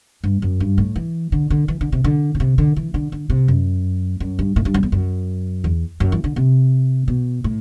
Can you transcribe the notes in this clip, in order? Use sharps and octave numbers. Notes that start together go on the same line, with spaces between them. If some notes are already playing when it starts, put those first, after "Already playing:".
G2
F#2
G2
A2
E3
D3
D3
E3
D3
C3
D3
D3
C3
D3
E3
D3
D3
C3
F#2
F#2
G2
A2
G2
F#2
E2
F#2
E2
F#2
E3
D3
C3
B2
A2